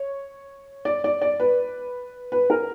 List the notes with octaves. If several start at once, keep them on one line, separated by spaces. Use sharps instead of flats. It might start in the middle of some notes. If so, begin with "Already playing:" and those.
Already playing: C#5
D5
D5
D5
B4
B4
A#4